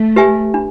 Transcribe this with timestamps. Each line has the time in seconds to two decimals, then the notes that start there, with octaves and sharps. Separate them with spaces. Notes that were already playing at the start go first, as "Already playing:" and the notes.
Already playing: A3
0.16 G4 B4 E5 G#5
0.54 D4